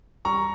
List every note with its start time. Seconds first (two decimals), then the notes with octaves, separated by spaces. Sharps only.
0.25 G3 A#5 C#6